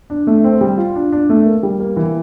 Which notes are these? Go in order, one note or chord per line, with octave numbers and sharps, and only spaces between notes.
D4
A3
C4
G3
F4
D4
D4
A3
A#3
G3
A#3
E3